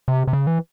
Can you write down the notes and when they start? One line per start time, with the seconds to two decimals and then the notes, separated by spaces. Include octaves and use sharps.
0.08 C3
0.27 C3
0.33 C#3
0.47 E3